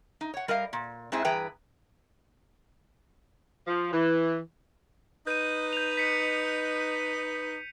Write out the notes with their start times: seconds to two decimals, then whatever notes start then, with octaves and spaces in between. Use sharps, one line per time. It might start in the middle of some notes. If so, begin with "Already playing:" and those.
0.21 D#4
0.34 C#5 F#5
0.48 G3 A#4 D#5 F5
0.73 A#2
1.12 G#2 C4 E4 G#4
1.24 G2 E3 G#4 B4 G5 A#5
3.67 F3
3.93 E3
5.27 D#4 B4 G6 D#7
5.73 G6 F7
5.97 B6 C#7